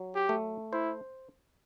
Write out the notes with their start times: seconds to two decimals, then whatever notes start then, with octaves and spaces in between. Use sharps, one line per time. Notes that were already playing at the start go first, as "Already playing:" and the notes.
Already playing: F#3
0.15 G4
0.29 A3
0.73 E4 C5